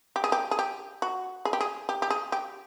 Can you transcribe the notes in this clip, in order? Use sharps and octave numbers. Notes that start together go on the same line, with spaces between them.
G4
G#4
G4
G#4
G4
F#4
G#4
G4
G#4
G4
G4
G#4
G4